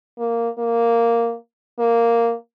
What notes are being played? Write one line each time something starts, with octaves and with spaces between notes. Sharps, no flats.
A#3
A#3
A#3